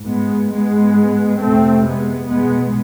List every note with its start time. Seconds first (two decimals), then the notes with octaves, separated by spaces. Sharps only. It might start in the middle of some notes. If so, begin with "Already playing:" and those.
Already playing: G#2
0.08 G#3 B3
0.52 G#2 G#3 B3
1.40 F2 C3 A3 C4
1.84 G#3 B3
2.28 E2 B2 G#3 B3